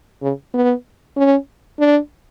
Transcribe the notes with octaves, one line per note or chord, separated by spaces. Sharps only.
C#3
B3
C#4
D4